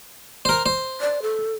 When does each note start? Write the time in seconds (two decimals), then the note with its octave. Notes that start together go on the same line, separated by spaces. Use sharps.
0.45 A#4 C5
0.66 C5
1.01 D5
1.22 A4